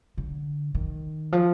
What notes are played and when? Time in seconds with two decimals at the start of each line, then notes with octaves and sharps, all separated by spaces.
0.18 D3
0.75 D#3
1.32 F3